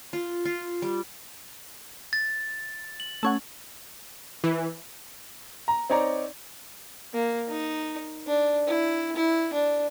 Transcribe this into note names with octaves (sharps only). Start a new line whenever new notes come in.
F4
F4
G3
A6
F#7
A3 C#4 F#5
E3
A#5
C4 D#4 C#5 D5 A#5
A#3
D#4
D4
E4
E4
D4